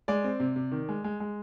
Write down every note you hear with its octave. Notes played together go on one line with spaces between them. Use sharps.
G#3 D5
C4
C3
C3
D#3
G#3
G#3
G#3